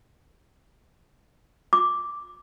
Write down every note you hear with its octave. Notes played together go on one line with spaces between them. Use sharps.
D6